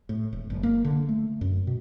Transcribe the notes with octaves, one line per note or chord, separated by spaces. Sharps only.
A2
E1
F#1
A#3
D3
A3
F#2
B2